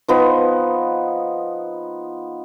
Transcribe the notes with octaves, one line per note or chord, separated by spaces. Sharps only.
F3 B3 D#4